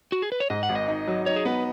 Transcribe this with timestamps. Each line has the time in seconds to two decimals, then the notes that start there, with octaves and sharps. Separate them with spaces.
0.12 F#4
0.22 G#4
0.32 B4
0.40 C#5
0.50 G#2 D#5
0.63 F#5
0.69 G#1
0.75 D#5
0.88 D#4
1.07 F#3
1.26 D#4 C#5
1.36 G#4
1.45 B3 B4